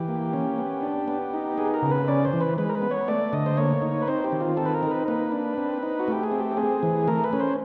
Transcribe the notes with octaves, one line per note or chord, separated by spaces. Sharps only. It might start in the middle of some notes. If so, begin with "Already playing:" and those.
Already playing: E3 G4
A#3
C#4
B3
D4
B3
D#4
B3 G#4
A#4
C#3
B4
C#4 D5
C5
E3
B4
G#3 B4
A#4
B4
B3
C#5
A3 D5
D3 D#5
C5
A#3 C#5
D#4
B4
C4 C5
G4
D#3
F4
C4 A4
B4
A#4
D#4
B4
A#3 B4
D4
C4
D#4
F#4
A3 G4
G#4
C4
G4
C4 G#4
E3
A3 A#4
B4
C#4
C5